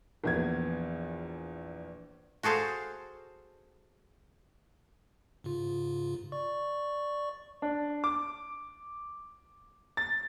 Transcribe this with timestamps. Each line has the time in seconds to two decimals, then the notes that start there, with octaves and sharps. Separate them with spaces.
0.24 A#1 E2 G#6
2.43 F#4 G#4 A4 C5 F5
5.44 G#2 C#3 F4
6.32 D5 C#6
7.62 D4
8.04 D6
9.97 A6